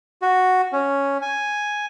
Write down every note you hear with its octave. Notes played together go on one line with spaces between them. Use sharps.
F#4
C#4
G#5